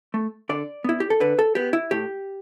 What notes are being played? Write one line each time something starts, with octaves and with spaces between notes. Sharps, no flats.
A3
D3 D5
B3 E4
G4
A4
D3 B4
A4
B3 G4
E4
A2 G4